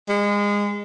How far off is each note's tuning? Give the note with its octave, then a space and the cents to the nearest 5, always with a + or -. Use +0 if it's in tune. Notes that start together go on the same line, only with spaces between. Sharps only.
G#3 -25